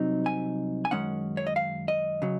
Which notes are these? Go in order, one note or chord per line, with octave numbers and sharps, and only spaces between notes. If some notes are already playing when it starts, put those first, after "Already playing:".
Already playing: C2 C3 F#3 C4 D#4
G#5
G#5
F#2 D#3 G#3 C#4 F#5
C#5
D#5
F5
D#5
C#3 F#3